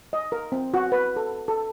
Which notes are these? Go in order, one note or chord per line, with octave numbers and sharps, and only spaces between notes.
D#5
A#4
C4
F#4
B4
A4
A4